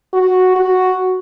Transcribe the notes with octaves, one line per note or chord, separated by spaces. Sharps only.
F#4
F#4